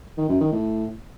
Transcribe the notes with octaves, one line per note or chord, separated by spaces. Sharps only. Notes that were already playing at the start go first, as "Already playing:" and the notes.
D#3
F#2
D#3
A2